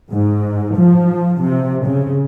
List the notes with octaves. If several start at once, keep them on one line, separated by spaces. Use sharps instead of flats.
G#2
F3
C3
C#3